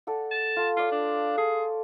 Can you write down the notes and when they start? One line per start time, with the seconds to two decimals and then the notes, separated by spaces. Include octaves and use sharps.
0.07 A4 D5 F#5
0.31 A5
0.56 F4 A4
0.77 F4 C#5 D5 F5
0.92 D4
1.37 G#4 A4